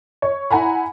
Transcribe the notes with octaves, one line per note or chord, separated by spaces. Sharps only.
C#5
E4 F#5 G#5 A#5 B5